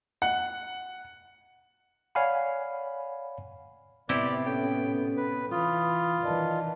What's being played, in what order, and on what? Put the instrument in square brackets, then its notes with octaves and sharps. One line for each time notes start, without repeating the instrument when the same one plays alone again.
[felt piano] F#5
[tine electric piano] C#5 D5 F5 F#5 G#5 B5
[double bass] A2 B3 [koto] C3 E4 G4 [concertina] D5
[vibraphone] C#4 A4 C#5 [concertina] G5
[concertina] B4
[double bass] E3 [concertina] F4 [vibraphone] B5 D#6
[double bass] D#3 E3 [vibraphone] D5 D#5 A5